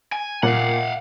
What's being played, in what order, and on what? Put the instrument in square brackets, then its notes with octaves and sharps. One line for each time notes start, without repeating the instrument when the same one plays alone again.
[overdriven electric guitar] G#5
[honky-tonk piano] A#2 [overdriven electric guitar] F5 F#5